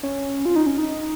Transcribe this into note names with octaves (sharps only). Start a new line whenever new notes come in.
C#4
F4
D#4
C#4
D#4